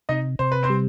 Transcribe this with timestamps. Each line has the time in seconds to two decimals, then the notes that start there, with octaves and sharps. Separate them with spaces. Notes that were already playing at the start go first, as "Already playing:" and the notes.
0.09 C3 D#4 D#5
0.39 C3 C5
0.52 B4
0.63 C4 C5
0.70 G3